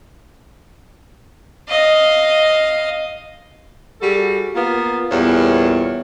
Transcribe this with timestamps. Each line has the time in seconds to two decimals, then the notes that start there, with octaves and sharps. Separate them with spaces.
1.69 D#5 F5
4.01 G3 F#4 G#4 A4
4.55 A#3 B3 F4
5.10 E2 A#2 G3 C#5